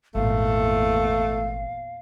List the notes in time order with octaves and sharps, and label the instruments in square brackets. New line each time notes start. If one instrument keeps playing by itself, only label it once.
[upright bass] G#1 [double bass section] E2 A#2 [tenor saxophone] A3 [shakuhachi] F5